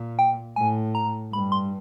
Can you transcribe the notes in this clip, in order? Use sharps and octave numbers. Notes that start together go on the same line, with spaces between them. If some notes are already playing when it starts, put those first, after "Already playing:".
Already playing: A#2
G5
A2 G#5
A#5
G2 B5
C6